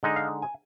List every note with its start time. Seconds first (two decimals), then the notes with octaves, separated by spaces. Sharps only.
0.03 D3 G#3 D#4 D#5
0.16 F5
0.42 G#5